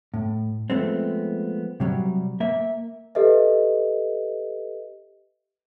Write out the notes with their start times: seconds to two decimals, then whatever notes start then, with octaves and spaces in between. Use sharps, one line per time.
0.14 A2
0.70 F3 G#3 A3 B3 C4
1.80 C3 F#3 G3
2.40 A#3 E5
3.15 G4 A4 B4 D#5 E5